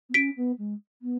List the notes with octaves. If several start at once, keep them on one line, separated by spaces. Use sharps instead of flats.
B3
C#4 B6 D7
B3
G#3
B3